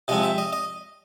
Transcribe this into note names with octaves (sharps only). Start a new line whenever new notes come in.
C3 F3 G#3 C4 D#5
E5
D#5
D#5